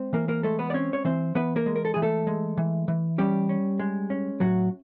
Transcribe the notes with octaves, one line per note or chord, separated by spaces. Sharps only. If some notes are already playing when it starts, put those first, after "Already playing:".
Already playing: G#3 C4
E3 A#3 A#4
A#3 A#4
G#3 A3 A4
B3 B4
D5
C4 C#4 C#5
C#5
E3 C4 C5
E3 B3 B4
A#3 A#4
G#3
A#4
A4
E3 G#4
A3 A4
G#3
E3
E3
G3 C#4 G4
C#4
G#3
C#4
A2 F#3 F#4